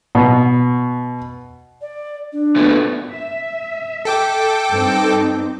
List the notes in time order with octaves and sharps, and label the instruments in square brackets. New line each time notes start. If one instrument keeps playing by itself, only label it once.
[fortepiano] B2
[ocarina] D5
D4
[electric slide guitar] A#2 A3 B3
[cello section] E5
[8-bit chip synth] A4 G5 D6
[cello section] G2 C4 D#4